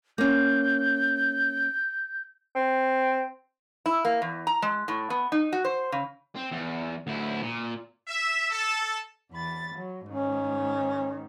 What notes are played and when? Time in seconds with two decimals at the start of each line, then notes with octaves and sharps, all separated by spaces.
0.18 A#3 C#4 G6
2.55 C4
3.86 E4
4.05 A#3
4.22 E2
4.47 A#5
4.62 G#3
4.88 A2
5.10 B3
5.32 D#4
5.53 F#4
5.65 C5
5.92 C#3
6.36 C4
6.52 E2
7.07 D2 E4
7.42 A#2
8.08 E5
8.50 A4
9.32 E2 B5 A6
9.76 F#3
10.09 G#2 D#3 C#4